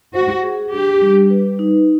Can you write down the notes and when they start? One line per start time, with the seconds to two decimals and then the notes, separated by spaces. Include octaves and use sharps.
0.14 F#4 C5
0.43 G#4
0.72 D4 G4
1.01 G3
1.30 B4
1.59 D#4